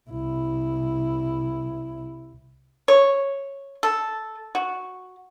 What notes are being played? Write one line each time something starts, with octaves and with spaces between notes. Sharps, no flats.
C2 E4
C#5
A4
F#4